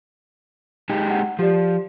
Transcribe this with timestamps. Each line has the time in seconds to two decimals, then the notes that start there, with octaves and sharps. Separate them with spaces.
0.89 G#3 D#4 G4
1.09 F#5
1.39 F3 G4 D5